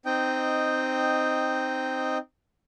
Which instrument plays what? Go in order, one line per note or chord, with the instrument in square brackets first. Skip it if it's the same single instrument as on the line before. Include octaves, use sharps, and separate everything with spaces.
[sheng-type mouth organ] C4 D#4 D#5 G5